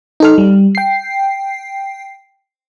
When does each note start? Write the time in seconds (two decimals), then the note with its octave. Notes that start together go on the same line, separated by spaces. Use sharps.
0.20 D#4 A4 F6
0.38 G3
0.75 G5 C7